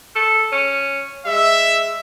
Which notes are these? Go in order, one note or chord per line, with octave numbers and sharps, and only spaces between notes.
A4
C#4
G#3 E5